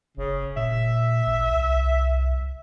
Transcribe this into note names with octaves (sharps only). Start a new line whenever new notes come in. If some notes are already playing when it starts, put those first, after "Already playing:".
F#1 C#3
A#2 E5
A1
C2